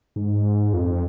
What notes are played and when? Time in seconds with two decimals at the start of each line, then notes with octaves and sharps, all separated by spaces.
0.16 G#2
0.73 F2